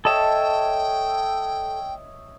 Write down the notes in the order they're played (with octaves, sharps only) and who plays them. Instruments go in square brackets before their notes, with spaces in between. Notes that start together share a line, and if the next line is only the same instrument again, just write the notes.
[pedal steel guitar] A4 A5 [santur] C#5 D#5 E5 [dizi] G5